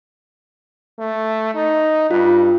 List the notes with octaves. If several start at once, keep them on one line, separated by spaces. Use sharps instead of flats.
A3
D#4
G2 F4